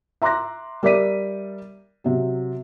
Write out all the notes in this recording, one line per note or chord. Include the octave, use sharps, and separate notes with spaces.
E5 A#5 C6 D6 F#6 A#6
G3 A#4 D5 E5 B6 D#7
C3 F#3